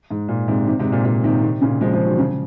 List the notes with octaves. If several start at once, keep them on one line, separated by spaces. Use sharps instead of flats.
G#2
A#2
G#2 C3
C3 D#3
G#2 C3
A#2
A#2
C3 D#3
C3 D#3
A#2 C#3
F3 G#3
F3 G#3
D#3 F#3
C#3 F3